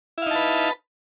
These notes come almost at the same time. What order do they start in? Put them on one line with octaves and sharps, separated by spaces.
E4 F5 D#4 A5 B4